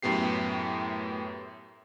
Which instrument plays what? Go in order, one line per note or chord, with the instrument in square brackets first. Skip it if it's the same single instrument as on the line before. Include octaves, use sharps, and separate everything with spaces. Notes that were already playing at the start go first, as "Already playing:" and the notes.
[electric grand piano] F#2 A2 B3 G4 C7